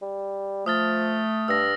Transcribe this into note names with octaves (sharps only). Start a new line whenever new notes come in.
G3
F3 A3 D#6 F6 A6
G2 E6 A#6